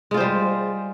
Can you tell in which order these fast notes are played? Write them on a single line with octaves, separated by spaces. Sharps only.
G#3 F4 C5 G3